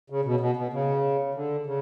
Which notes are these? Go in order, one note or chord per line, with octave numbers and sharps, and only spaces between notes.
C#3
B2
B2
B2
C#3
D3
C#3